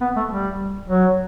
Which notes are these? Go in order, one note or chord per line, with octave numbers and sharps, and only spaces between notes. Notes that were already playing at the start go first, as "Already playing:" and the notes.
B3
A3
G3
F#3